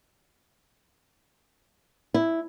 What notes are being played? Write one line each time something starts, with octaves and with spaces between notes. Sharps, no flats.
E4